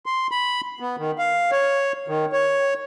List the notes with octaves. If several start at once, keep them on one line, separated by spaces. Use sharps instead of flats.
C6
B5
B3
D#3
F5
C#5
D#3
C#5